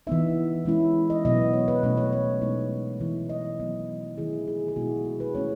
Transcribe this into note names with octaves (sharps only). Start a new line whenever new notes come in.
E3 B3 D#4 E5
E3 G#3 C#4 E4
D#5
B2 F#3 B3 D#5
C#5
B4
B2 A3 C#4 B4
C#5
C#5
B2 G#3 B3 D#4
E3 B3 E4
D#5
D#3 F#3 B3
D#3 A3 E4 G#4
G#4
G#4
B2 G#3 B3 E4 F#4
G#4
B4
D#3 A3 C#4 E4 C#5